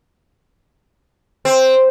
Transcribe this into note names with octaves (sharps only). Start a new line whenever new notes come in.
C4